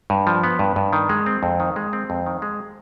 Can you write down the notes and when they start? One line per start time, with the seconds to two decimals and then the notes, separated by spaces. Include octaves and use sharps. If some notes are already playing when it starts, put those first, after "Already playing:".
0.10 G2
0.27 F3
0.44 B3
0.59 G2
0.76 G2
0.93 D#3
1.09 G#3
1.26 C4
1.43 F2
1.60 D#3
1.76 G#3
1.93 C4
2.10 F2
2.26 D#3
2.42 G#3